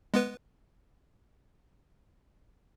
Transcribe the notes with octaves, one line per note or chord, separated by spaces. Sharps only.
G#3 B3 B4